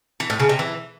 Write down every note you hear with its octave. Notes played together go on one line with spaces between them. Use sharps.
E3
A2
C#3
C3
E3